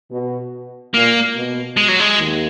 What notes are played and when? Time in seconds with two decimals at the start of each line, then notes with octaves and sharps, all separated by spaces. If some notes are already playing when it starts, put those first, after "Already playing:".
0.11 B2
0.94 A#2 A#3
1.36 B2
1.77 G#3
1.88 F#3
2.00 G#3
2.17 D#2 D#3